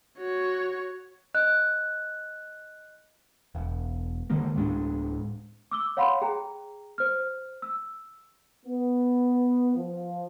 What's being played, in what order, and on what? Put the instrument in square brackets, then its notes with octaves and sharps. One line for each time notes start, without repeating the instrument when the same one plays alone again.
[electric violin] F#4 C#5
[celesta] D#5 F#6
[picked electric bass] E1
D3 D#3 G#3 A#3
D1 A2 G#3 D4
[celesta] D6 E6 G7
C#5 F5 F#5 B5 C6
G#4 G5 A#5
C5 F6
E6
[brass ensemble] B3
F3